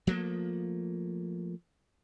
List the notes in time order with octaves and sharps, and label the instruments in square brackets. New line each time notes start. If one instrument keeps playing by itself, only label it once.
[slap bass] F3 F#3 A3 A#3